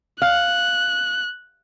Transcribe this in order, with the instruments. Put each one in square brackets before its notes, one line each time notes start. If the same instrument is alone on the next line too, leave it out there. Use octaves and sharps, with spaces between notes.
[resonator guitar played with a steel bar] F5 [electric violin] F#6